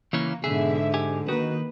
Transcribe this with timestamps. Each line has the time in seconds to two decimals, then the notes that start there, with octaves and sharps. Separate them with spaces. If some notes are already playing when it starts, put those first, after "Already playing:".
0.13 C#3 E3 A#3 C#4
0.44 G#2 B2 D3 G#4 E5
0.94 G4 G#5
1.28 D#3 A#3 F#4 B4